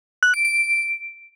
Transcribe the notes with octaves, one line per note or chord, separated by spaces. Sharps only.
F#6
D7
D7